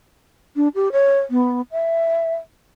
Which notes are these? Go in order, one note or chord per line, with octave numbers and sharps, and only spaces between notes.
D4
G4
C#5
B3
E5